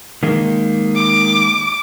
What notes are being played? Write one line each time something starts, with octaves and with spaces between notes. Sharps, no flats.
D#3 G#3 A#3
D6